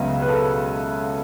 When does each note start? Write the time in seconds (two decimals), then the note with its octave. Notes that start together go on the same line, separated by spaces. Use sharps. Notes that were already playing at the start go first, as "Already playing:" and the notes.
Already playing: C#2 C#3 F#3 B3 E5
0.22 B4
0.29 A4